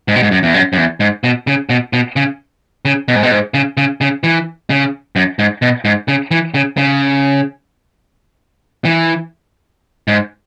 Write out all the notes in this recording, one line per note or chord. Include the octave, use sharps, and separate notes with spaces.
G#2
B2
G#2
F#2
E2
F#2
F#2
E2
G#2
B2
C#3
B2
B2
C#3
C#3
B2
G#2
B2
G#2
C#3
C#3
C#3
E3
C#3
F#2
G#2
B2
G#2
C#3
E3
C#3
C#3
E3
G#2